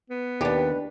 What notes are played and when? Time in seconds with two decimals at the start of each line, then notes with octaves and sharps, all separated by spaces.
0.10 B3
0.41 D#2 D4 G4 B4